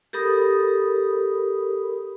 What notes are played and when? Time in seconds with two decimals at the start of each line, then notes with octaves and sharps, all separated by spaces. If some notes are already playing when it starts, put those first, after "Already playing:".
0.13 G4 A4 A#4 B5 D#6